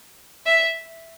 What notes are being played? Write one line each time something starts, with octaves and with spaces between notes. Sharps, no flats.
E5